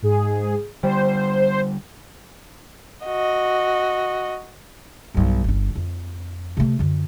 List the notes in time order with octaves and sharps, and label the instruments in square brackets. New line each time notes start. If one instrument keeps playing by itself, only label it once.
[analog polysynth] G#2 G#4
[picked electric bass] D3 G3 [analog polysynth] C5
[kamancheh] F#4 D#5
[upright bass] B1 G2
G1 D4
F2
C3 A3
F#2 D3